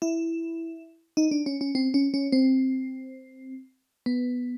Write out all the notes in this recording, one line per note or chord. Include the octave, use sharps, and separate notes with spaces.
E4
D#4
D4
C#4
C#4
C4
C#4
C#4
C4
B3